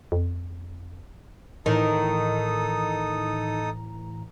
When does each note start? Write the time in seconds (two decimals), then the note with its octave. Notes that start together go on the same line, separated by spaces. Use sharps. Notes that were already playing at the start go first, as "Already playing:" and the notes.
0.12 F2
1.66 A2 D#3 E3 D#4 A4 A#5 D#6